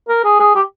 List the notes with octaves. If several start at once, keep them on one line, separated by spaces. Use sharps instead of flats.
A#4
G#4
G#4
G4